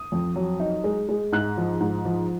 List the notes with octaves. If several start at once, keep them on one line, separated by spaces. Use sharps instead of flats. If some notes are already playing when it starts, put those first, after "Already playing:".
Already playing: D#6
F2
F#3
D#4
G#3
G#3
G#2 F#6
F3
G#2
F3